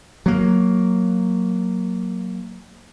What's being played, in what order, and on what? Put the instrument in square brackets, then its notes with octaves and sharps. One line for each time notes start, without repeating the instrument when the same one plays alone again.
[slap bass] F#3 A#3